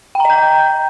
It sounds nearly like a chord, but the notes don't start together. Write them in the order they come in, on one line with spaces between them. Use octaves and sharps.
G5 A#5 D#5 G6